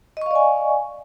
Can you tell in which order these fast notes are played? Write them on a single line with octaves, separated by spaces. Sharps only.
D#5 C#6 F5 D5 G#5